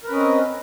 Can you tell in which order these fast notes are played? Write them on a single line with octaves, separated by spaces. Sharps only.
A#4 B4 C#4 D#5 C4